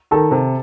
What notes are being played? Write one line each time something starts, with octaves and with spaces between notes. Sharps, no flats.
D#3 A4
C3